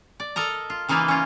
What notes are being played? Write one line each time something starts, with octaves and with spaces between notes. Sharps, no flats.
D5
A4 A#4 D#5 A#5
F4
C#3 E3 A#3 D#4 F4 B4
C#4 F4